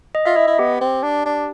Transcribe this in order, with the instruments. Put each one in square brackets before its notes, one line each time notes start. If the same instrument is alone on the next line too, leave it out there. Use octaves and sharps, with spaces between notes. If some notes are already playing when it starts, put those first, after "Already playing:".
[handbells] D#5
[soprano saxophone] F4 [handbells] E5
[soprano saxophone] E4 [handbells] D#5
[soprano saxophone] E4
[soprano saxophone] B3 [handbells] G4
[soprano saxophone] C4
D4
D4